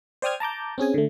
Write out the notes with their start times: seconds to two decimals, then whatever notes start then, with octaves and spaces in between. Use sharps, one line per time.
0.22 C5 D5 G5 D#6 F6 G#6
0.40 A5 A#5 D6 G6
0.78 C4 C#4 G#4 G#5
0.94 D3 A3